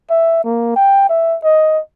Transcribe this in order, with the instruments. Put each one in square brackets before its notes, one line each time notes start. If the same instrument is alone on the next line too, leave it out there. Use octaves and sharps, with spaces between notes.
[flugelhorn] E5
A#3
G5
E5
D#5